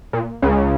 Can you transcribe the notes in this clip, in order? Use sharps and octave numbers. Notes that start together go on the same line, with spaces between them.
A#2
C#2 C#3